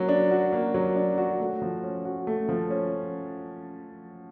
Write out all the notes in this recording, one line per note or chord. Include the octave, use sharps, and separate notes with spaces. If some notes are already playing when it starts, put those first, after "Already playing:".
Already playing: F#3 A#3
D4
F#4
A#3
F#3
D4
F#4
A3
F3
C#4
F#4
A3
F3
C#4